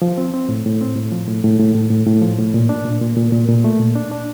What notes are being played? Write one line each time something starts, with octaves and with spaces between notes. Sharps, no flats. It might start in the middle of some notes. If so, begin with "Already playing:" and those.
F3
C4
C4
A2
A2
C4
A2
F3
A2
A2
A2
A2
A2
A2
F3
A2
A#2
D4
A#2
A#2
A#2
A#2
A#2
A3
A#2
D4
D4